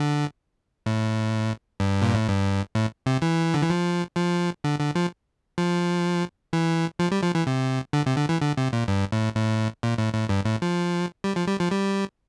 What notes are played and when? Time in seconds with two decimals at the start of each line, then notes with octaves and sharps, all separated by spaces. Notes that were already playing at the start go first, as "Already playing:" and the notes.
Already playing: D3
0.86 A2
1.80 G2
2.02 A#2
2.14 A2
2.28 G2
2.75 A2
3.06 C3
3.22 E3
3.54 D3
3.62 E3
3.70 F3
4.16 F3
4.64 D3
4.79 D3
4.95 F3
5.58 F3
6.53 E3
6.99 F3
7.11 G3
7.23 F3
7.35 E3
7.47 C3
7.93 D3
8.06 C3
8.17 D3
8.29 E3
8.41 D3
8.57 C3
8.73 A#2
8.88 G2
9.12 A2
9.35 A2
9.83 A#2
9.98 A2
10.15 A2
10.29 G2
10.45 A2
10.62 F3
11.24 G3
11.36 F3
11.47 G3
11.60 F3
11.71 G3